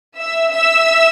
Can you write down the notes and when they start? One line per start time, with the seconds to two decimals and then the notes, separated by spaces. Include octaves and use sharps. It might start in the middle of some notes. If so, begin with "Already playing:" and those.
0.18 E5 E6
0.50 E5 E6